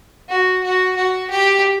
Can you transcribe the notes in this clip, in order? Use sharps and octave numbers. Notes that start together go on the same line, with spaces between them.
F#4
F#4
F#4
G4